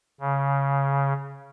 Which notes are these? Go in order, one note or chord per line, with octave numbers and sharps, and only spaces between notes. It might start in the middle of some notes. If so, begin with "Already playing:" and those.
C#3